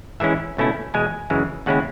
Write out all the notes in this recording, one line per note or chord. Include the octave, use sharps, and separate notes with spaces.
G#2 E3 G#3 C#4 E4 E5
C#2 B2 A3 C#4 E4
E2 B2 G#3 G#5
F#2 C#3 E3 G#3
D#2 C#3 G#3 C#4 E4 F#5